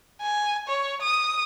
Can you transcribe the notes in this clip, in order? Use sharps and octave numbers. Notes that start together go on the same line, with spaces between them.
G#5
C#5
D#6